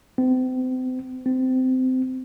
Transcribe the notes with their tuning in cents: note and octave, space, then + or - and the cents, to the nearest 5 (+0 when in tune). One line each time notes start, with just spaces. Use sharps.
C4 -35
C4 -20